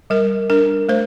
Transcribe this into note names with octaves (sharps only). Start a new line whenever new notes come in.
G3 A#4
D4 A#4
A3 C5